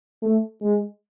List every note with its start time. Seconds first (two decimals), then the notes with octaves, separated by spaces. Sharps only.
0.23 A3
0.62 G#3